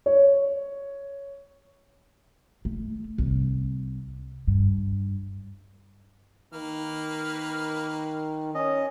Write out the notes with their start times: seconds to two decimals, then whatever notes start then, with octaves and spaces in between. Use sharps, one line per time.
0.06 C#5
2.65 A3
3.18 C2
4.47 G2
6.53 D#3 A#3 B4 F6
8.55 C#4 D#5